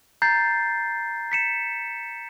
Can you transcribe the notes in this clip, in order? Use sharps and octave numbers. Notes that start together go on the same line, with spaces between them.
A#5 G6 A6 C7
B6 C#7 E7